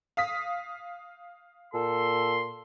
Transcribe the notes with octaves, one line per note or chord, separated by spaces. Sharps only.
F5 D#6 B6
A#2 A4 C6